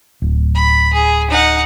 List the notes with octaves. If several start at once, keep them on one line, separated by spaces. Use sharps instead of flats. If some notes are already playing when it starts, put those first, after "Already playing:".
D1
B5
G#4
D#4 F#5